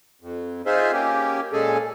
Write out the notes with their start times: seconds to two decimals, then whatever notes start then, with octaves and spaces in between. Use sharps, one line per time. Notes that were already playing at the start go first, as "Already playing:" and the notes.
0.22 F2
0.66 D#4 F4 G#4 C5 E5
0.93 A#3 C#4 G4
1.53 A#2 G#3 C#4 G#4 A4